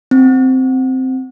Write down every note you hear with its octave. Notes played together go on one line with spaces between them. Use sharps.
C4